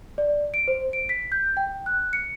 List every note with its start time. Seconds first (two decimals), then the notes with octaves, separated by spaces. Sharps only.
0.18 D5
0.54 D7
0.68 C5
0.93 D7
1.09 B6
1.32 G6
1.57 G5
1.86 F#6
2.13 C#7